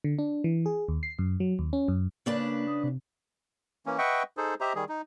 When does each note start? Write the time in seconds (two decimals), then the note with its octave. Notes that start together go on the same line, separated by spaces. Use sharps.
0.04 D3
0.19 D4
0.44 E3
0.66 G#4
0.88 D#2
1.03 C7
1.19 F#2
1.40 F#3
1.59 D#2
1.73 C#4
1.88 F#2
2.26 C#3 A#3 D4 B4
2.67 D#6
2.84 C3
3.86 E3 A#3 C#4
3.98 B4 D#5 E5 F#5 G5 C#6
4.37 D#4 G#4 A4 C5
4.61 G4 C5 D#5 E5 A#5
4.75 D#3 G3 G#4
4.89 D#4